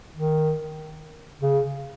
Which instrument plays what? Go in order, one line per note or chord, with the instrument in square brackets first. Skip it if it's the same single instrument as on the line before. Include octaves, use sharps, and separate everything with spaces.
[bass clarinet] D#3
C#3